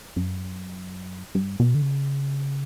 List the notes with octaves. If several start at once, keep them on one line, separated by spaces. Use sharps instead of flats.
F#2
G2
B2
D3
C#3